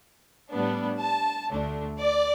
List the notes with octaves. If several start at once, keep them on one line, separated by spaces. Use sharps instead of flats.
A2 G3 B3 D4
A5
D2 D3 A3 D4
D5